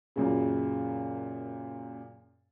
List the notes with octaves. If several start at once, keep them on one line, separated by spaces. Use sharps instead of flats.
F#2 A#2 C#3